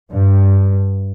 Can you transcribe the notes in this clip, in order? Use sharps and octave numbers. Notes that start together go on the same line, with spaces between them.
G2